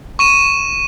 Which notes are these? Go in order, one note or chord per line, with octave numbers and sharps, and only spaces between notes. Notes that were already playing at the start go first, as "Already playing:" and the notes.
C#6 D#7 E7